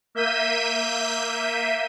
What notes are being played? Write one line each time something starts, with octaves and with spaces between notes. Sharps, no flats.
A#3 E5 G6 B6 D#7